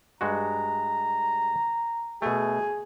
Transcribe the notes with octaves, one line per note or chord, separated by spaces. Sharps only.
G2 G#3 F#4 A#5
B2 A3 G#4